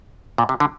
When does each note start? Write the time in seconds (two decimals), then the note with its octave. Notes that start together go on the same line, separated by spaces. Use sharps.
0.38 A#2
0.49 C3
0.60 D3